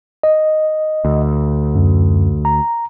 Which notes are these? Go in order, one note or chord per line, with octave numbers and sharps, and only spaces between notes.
D#5
D2
F#2
A#5